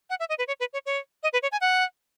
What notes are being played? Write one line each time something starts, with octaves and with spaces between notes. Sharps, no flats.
F#5
E5
D#5
B4
C#5
B4
C#5
C#5
D#5
B4
C#5
G#5
F#5